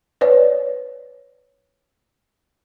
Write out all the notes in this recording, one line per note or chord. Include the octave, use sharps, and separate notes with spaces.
B4 C#5 D5